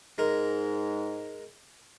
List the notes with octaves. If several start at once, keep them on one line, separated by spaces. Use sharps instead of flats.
G#2 G#3 A#4